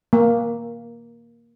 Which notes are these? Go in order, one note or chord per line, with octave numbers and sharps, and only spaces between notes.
A#3